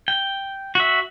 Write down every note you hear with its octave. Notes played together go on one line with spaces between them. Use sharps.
G5
F#4 E5